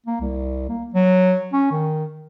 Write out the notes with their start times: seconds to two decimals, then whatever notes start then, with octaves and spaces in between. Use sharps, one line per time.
0.06 A#3
0.21 C2
0.69 A#3
0.94 F#3
1.53 C#4
1.72 D#3